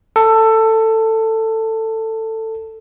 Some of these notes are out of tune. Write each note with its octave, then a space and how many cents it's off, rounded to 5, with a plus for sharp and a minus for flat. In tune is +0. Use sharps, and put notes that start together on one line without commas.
A4 +15